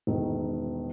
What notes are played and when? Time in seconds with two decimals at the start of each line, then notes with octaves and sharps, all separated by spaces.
0.07 E1 D#3